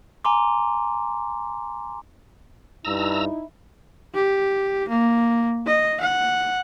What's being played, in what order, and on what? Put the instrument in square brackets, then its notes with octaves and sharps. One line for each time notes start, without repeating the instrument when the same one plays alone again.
[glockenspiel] G#5 A#5 C6 D6
[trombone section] G2 [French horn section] D#4 E4 [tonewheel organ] A#5 E6
[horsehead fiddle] G4
A#3
D#5
F#5